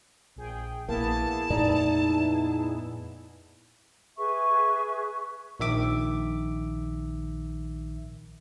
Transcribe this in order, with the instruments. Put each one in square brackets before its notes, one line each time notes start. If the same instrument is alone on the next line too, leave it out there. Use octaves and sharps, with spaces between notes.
[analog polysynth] A#1 G#4 G5
[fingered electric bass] A#1 [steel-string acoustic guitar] A#3 [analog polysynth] B3 E4 G#4 [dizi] A5
[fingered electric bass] F2 A#2 A3 [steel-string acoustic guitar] D#4 D5 A#5
[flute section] G#4 B4 E5 C#6
[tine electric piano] A#1 D#3 E5 D6